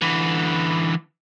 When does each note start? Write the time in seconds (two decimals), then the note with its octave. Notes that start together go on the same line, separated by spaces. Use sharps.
0.02 D3 E3